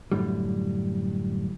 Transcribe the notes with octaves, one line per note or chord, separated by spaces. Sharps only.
F#2 A2 D3 G3